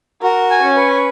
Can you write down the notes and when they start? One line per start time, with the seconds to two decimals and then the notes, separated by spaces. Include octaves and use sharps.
0.23 F#4 A#4
0.50 G#5
0.63 C#4
0.76 B4